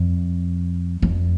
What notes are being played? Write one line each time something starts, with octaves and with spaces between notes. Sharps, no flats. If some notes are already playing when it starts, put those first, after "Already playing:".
Already playing: F2
F2